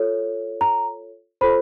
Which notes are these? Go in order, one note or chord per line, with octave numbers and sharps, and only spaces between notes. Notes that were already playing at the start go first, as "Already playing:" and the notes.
Already playing: F4 A4 C#5
A#5
F4 A4 C5 B5